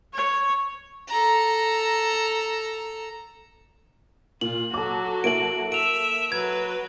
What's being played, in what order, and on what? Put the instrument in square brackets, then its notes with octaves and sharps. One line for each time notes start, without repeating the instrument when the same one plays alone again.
[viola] C#5
[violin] A4 A#5
[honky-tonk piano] A#2 [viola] F4 [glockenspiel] F#7
[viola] F#3 F#4 [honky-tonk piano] A4 D6
[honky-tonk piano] A#3 E4 A4 [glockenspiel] D7 F#7
[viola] E5 [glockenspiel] D7 F7
[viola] F#3 B4 [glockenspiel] G#6